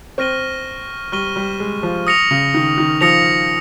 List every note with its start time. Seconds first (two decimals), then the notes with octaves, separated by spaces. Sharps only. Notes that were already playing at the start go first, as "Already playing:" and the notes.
0.18 C4 C#6 F6 A#6 D#7 G7
1.12 G3 C#6 F6 A#6 D#7 G7
1.36 G3
1.60 G#3
1.83 F3
2.07 D#6 A#6 C#7 F7
2.31 C#3
2.54 D#3
2.78 D#3
3.01 F3 D#6 A#6 C#7 F7